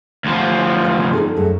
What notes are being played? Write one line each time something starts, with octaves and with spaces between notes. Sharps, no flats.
D2 F3
D#5 F5
C3
D#4 G#4 A4
F#2 A3